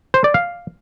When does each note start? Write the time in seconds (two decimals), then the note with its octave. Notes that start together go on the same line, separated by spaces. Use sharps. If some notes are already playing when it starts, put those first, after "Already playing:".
0.14 C5
0.24 D5
0.34 F5